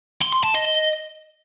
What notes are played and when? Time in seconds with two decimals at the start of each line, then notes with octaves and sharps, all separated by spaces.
0.22 C6
0.33 C6
0.44 A5
0.55 D#5